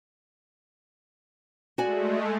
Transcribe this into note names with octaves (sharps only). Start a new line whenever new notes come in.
G#3 A3 F#4 D5 G#5